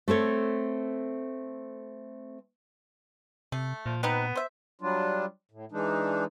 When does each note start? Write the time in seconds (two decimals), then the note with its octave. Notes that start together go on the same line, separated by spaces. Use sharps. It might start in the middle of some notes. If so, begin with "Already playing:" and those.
0.08 A3 C4 A4 C#5
3.52 C3 A3
3.86 A#2 F3
4.03 B3 C4 D#4 B4
4.36 C5 E5
4.81 F#3 G3 D4 F4
5.51 A2
5.72 E3 G#3 D4 D#4